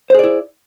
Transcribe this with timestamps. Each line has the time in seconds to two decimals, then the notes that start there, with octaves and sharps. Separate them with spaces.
0.10 C5
0.15 G#4
0.19 D5
0.23 E4